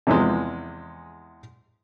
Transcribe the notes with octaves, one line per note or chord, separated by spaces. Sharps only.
E2 C3 E3 F3 G#3